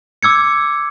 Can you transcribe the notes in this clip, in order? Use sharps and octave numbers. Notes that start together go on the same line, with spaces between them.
D6 E6 G#6 C#7